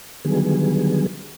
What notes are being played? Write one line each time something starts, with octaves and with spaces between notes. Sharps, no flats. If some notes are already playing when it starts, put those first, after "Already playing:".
D3 D#3 F#3 G3 B3 G#4